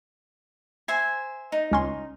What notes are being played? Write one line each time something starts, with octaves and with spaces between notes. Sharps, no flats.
C5 E5 G#5
D#4
C#2 C#4 C6